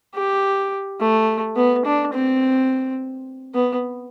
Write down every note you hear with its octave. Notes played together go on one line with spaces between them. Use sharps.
G4
A3
B3
D4
C4
B3